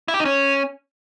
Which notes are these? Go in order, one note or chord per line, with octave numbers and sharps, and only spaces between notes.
E4
G4
D#4
C#4